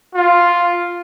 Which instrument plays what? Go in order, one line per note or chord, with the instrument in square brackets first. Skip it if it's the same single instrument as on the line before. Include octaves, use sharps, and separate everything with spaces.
[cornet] F4